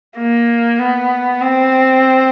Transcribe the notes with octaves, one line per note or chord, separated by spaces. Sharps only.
A#3
B3
C4